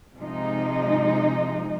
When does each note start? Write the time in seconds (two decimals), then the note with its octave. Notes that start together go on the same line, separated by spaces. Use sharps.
0.18 C3 F3 G#3 D#4